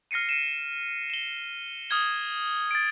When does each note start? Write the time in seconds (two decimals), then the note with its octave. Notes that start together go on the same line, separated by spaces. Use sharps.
0.11 F6 A#6 C7 C#7 D#7
0.29 C#7 D#7 E7
1.10 E7 G7
1.90 D#6 F6 G#6 G7
2.71 A6 D7